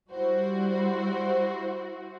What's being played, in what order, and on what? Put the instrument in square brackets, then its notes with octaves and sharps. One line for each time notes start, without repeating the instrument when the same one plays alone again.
[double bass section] G3 [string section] E4 F#4 C5